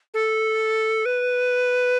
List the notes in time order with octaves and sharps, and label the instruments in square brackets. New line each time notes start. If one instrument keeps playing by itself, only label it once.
[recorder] A4
B4